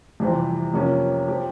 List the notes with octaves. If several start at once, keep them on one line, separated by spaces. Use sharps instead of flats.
F2 C3 E3 G3 C4
F2 C3 F3 A#3 C#4
F3 C4 G4